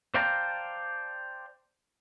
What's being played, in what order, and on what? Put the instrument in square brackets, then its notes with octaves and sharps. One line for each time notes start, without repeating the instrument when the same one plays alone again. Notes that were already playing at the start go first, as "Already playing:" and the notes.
[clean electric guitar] C5 D5 F5 G5 A5 A#5